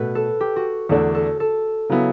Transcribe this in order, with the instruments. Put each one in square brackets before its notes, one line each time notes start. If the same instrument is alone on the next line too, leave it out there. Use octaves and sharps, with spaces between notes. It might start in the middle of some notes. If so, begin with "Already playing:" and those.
Already playing: [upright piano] B2 A3 [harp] B4
[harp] A4
G4
F#4
[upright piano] E2 D3 A3 D4 [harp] A4
[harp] A4
A4
[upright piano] C#3 F#3 B3 E4